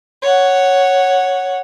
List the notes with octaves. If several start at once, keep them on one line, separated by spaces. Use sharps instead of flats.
C#5 F#5